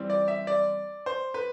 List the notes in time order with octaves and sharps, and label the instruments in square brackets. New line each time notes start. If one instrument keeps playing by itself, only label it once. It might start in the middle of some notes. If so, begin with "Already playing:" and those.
Already playing: [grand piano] E3 G3 C4
D5
E5
D5
C5
B4